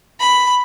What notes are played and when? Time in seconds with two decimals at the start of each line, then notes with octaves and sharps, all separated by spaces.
0.20 B5